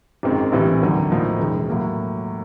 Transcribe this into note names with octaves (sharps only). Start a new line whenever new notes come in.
G#1 F#2 D#3 G#3 C4
A#1 A2 E3 G3 C4
D#2 D3 F#3
A2 F3 A#3 D#4
E1 D#2 C#3
A2 F#3 A#3